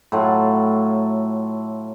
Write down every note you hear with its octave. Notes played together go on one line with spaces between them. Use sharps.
A2 F#3 F4